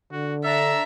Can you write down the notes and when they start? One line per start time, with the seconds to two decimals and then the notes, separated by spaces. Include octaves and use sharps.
0.12 D3 F#4
0.44 D4 A4 E5 A#5 E6